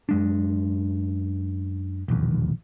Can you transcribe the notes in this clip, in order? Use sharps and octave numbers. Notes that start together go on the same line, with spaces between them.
F#2 G#3 D4
E1 A#1 D#2